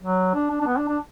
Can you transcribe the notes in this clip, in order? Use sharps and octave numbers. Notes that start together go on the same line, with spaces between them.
F#3
D4
D4
D4
B3
D4
D4